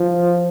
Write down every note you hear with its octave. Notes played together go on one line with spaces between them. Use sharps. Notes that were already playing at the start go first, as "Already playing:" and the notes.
Already playing: F3